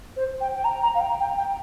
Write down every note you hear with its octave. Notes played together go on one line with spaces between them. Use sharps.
C5
G5
G5
A#5
A#5
F5
G5
G5
G5